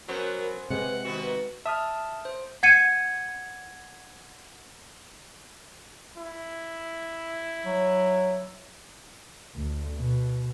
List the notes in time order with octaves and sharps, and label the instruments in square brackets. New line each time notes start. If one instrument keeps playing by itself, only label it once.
[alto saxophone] F#3 [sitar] B3 C#4 C5 [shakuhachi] A#4
[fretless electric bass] C3 G#3 [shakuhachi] B4 [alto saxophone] F#5
[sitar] D#3 B3 C4 [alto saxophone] F#4
[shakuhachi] B4
[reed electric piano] E5 D#6 F6 [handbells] A5
[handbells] C5
[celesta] F#5 G#6 C#7 D#7
[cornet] E4
[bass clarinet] F#3
[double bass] D2
B2